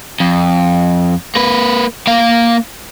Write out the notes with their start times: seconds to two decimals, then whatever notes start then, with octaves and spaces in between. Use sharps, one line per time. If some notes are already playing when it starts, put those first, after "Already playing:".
0.20 F2
1.36 A#3 B4
2.07 A#3 F5